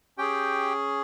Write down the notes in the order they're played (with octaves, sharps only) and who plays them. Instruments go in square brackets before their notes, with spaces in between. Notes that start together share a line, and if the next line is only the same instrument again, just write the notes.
[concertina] C#4 G4 G#4 G5